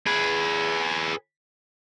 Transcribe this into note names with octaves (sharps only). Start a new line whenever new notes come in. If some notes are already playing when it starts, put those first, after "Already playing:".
G#4 B4